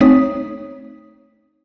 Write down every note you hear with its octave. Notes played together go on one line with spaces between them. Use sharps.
A3 C4 D#4 C#5 D#6 B6